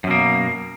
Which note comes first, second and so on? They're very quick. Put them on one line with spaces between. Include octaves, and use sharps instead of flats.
F#2 B2 A#3